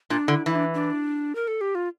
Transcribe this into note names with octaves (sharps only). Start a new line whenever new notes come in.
A#2 D4
D3 E4
E3 E4
D4
D4
A#4
A4
G4
F4